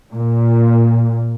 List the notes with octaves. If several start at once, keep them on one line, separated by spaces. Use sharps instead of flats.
A#2